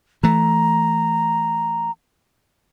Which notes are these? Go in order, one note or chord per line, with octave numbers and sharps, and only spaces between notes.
E3 A3 A#5